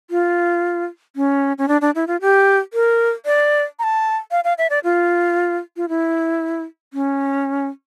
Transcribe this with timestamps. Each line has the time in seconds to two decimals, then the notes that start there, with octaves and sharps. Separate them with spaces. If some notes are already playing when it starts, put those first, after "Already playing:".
0.11 F4
1.16 C#4
1.58 C#4
1.68 D4
1.81 D4
1.95 E4
2.07 F4
2.21 G4
2.73 A#4
3.26 D5
3.79 A#5
3.83 A5
4.31 F5
4.44 F5
4.58 E5
4.70 D5
4.84 F4
5.77 F4
5.89 E4
6.94 C#4